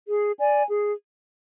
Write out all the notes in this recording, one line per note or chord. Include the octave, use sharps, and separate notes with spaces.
G#4
D5 G#5
G#4